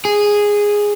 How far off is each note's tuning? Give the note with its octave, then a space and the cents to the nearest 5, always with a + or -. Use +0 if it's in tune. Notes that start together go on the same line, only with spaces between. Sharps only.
G#4 -5